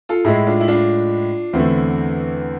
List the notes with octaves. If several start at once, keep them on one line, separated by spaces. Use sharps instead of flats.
F4 A4
A2 G#3 E4 G#4
D4 F4
E4
D4 F4
E2 D3 A3 C4 E4